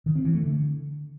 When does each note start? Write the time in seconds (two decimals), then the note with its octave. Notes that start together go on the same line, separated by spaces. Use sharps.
0.06 D#3
0.15 C4
0.24 E3
0.34 A3
0.43 D3